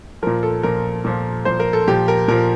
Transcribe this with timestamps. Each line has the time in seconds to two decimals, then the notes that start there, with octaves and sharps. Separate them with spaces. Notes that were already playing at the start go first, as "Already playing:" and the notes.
0.22 A#2 F3 A#4
0.43 A4
0.63 A#2 F3 A#4
1.04 A#2 F3
1.45 A#2 F3 C5
1.60 A#4
1.73 A4
1.88 A#2 F3 G4
2.08 A#4
2.28 A#2 F3 A#4